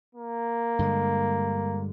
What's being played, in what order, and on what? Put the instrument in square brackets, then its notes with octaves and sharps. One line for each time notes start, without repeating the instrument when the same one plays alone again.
[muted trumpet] A#3
[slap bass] G2 D3 G#3